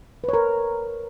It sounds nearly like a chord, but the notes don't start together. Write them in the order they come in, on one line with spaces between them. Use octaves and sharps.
B4 C#5 A#4